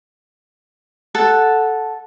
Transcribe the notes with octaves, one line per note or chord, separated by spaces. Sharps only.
A4 F#5 A5